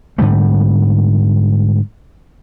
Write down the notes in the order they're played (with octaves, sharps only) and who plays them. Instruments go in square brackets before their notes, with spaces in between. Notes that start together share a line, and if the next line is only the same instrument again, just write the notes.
[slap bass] G#2 D3 G3 A3